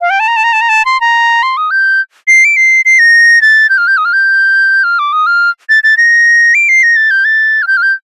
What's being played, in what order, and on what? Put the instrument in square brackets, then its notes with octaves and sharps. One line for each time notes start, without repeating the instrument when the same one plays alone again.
[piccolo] F5
G5
A5
A#5
A5
A#5
A5
A#5
A5
C6
A#5
C6
D#6
G6
C7
D7
C7
C7
A#6
A6
G6
F6
G6
D#6
F6
G6
F6
D6
D#6
F6
A6
A6
A#6
D7
C7
A#6
A6
G6
A6
F6
G6
F6
G6